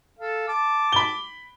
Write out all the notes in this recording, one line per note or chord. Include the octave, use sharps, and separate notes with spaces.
A4 F5
A5 D6
B5 G7